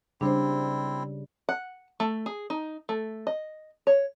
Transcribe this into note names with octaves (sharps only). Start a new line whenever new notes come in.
C#3 G3 C4 D4 E4 C5
F#5
A3
G#4
D#4
A3
D#5
C#5